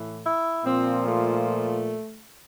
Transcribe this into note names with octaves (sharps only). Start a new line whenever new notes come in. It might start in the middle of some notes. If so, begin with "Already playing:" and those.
Already playing: A2 E3
E4
A#2 F3 C4
A3